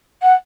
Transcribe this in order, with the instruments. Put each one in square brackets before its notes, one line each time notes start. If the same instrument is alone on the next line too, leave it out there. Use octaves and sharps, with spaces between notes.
[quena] F#5